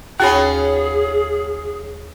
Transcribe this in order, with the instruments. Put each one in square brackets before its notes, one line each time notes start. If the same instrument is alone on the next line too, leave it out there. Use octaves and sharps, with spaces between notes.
[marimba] D#2 B5 [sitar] C#4 F4 F#4 [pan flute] G#4